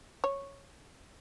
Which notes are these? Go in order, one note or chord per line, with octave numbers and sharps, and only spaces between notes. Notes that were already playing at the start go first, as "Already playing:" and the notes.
C#5